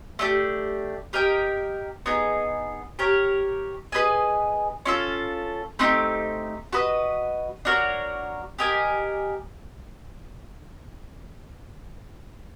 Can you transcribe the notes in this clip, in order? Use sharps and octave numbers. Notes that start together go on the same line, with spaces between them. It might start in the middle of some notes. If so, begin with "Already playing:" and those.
A3 D4 G4
G4 A#4 D#5 G5
B3 D#4 G#4
G4 A#4 C#5
G#4 B4 D#5 G#5
C#4 F4 A4
A3 C4 D#4 G4
F#4 B4 D#5
D4 F#4 A#4 C#5
G4 A#4 D#5 G#5